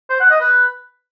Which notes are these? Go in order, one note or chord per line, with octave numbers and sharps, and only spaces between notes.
C5
F#5
D#5
B4